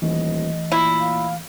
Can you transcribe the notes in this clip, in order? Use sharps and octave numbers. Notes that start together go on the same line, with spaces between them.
D#1 E3 A3 D#5
A#2 E4
F5